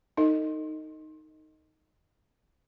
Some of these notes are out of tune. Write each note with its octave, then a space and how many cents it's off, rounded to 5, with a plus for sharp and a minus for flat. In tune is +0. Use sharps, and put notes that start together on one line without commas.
D#4 +0 A4 +45 D#5 +0